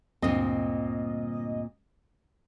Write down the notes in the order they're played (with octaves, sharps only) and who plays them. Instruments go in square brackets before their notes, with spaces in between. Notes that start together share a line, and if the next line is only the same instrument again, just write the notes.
[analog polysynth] D2 G2 D#5 [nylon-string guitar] A#2 C4